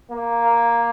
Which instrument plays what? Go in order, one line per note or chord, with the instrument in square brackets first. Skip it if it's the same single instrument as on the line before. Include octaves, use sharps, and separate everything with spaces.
[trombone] A#3